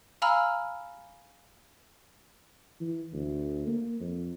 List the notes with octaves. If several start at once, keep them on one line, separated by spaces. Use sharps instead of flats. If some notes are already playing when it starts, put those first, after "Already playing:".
F5 G#5 A#5 B5 E6 F6
E3
D2
A#3
F2